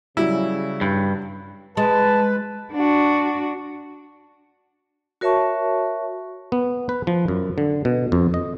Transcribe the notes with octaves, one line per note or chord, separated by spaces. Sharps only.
C#3 F#3 G3 E4
G2
G#3 B4 A5
D4 F#4
F#4 A#4 C#5 E5 A5 C#6
B3
B4
F3
F#2
D3
B2
F2
D#5